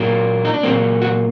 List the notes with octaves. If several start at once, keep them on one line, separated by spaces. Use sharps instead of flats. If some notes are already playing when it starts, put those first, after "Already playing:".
Already playing: A#2 F#3 A#3
D#4
D4
A#2 F#3 A#3 C4
F#4